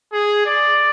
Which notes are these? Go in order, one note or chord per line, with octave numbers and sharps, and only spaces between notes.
G#4
D5